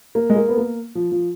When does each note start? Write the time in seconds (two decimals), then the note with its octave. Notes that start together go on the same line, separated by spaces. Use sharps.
0.15 A#3
0.30 G#3
0.36 A#3
0.49 B3
0.58 A#3
0.95 F3
1.12 F3